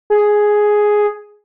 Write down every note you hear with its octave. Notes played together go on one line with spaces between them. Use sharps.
G#4